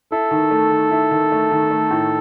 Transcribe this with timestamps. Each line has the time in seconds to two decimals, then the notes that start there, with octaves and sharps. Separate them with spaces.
0.12 E4 A4
0.31 D#3
0.51 A3
0.71 D#3
0.91 E4
1.11 D#3
1.32 A3
1.51 D#3
1.71 A3
1.91 A2